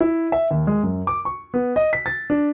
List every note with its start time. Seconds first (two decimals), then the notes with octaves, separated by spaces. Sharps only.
0.01 E4
0.32 E5
0.51 D#2
0.67 G#3
0.83 F#2
1.07 D6
1.25 C#6
1.54 B3
1.76 D#5
1.93 B6
2.06 A6
2.30 D4